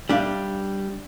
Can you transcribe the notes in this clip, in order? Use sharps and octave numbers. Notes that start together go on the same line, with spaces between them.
G3 D4 E5 F5